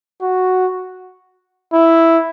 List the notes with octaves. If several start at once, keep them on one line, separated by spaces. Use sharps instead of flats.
F#4
E4